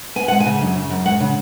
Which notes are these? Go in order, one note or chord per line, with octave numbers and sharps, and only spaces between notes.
B3 G#5
G#3 F#5
G#5
C#3
F#2
C#3
F#2
G#3 F#5
C#3